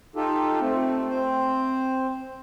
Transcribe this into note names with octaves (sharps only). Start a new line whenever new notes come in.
D#4 F4 G4 A4
A3 C4
C4 C5